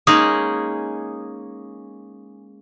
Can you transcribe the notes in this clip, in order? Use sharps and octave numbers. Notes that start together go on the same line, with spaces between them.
G#3 A#3 C#4 D#4 G#4